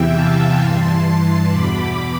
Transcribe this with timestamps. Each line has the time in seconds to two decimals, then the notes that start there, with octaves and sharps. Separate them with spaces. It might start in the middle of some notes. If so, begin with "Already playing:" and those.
Already playing: E2 C3 E3 E5 G5
0.11 F5 A5
0.57 G2 E3 A5 C6
1.48 E2 B2 B5 D6